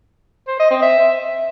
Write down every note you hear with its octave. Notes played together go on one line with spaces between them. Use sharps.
C5
D#5
C4
E5